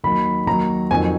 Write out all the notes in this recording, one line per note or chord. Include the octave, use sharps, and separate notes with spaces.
D#2 D#3 F#3 B5
D#2 D#3 F#3 A#5
F2 D#3 F#3 G#5